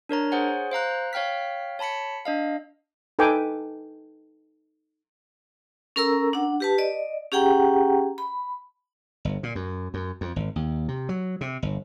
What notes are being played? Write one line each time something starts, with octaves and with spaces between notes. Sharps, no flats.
D4 A#4 C#5 A#5
G#4 C5 C#5 F#5 G#5
C5 F5 A#5 F#6
C#5 F5 G5 F6 B6
C#5 A5 B5 B6 C#7
D4 D#5 F5
D#4 A4 B4 G5 G#5 D6
C#4 A4 A#4 A#5 E6
D4 F#5
G4 B4 A5
D5 D#5
C#4 G4 G#4 F#5 G5 A#5
B5
G1
A#2
F#2
F#2
F2
G#1
D#2
C3
F#3
C3
G1